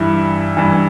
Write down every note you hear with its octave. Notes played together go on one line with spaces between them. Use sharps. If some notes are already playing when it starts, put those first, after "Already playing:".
Already playing: G2 E3 E4
G2 E3